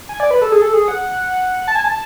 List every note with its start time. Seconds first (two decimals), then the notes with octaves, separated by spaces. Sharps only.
0.09 G#5
0.20 D5
0.31 B4
0.42 A4
0.52 G#4
0.62 A4
0.73 G#4
0.88 F#5
1.67 A5
1.75 G#5
1.84 A5